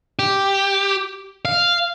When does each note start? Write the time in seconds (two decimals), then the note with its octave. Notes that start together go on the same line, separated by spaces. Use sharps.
0.19 G4
1.45 F5